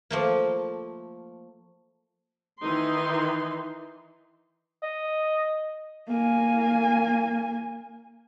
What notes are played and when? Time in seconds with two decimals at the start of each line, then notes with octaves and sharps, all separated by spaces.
0.11 F3 A3 A#3
2.61 D#3 E3 D#4 C6
4.83 D#5
6.08 A#3 G#5